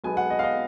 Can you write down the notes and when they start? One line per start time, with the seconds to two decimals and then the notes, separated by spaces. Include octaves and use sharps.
0.04 B1 B2 G#3 B3 G#5
0.17 F#5
0.30 D#5
0.39 F5
0.43 D#5